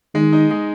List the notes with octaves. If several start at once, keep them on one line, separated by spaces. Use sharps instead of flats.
D#3 G#3
D#4
G#3